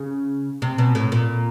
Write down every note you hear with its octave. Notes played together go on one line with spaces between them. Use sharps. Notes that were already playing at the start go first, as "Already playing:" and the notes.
Already playing: C#3
C3
B2
A2
A#2